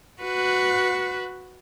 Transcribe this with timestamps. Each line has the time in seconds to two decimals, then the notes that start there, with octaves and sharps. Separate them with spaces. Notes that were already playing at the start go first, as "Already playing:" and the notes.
0.22 F#4 B4